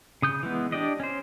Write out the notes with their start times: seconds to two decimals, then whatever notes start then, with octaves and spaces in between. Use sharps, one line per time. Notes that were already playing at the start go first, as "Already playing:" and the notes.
0.22 C#3 D#6 G6
0.43 E3 G#3 B3
0.72 D4 G4 D5 D#5
1.00 C#4 C5